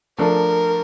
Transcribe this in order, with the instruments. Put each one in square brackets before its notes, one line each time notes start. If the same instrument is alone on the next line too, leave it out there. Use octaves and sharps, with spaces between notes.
[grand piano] F3 A3 D4 A4 [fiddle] A#4